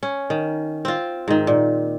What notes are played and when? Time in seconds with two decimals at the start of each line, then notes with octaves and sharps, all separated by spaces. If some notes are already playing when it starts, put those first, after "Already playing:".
0.03 C#4
0.30 D#3
0.85 C4 F4
1.28 G#2 D#3
1.47 A#2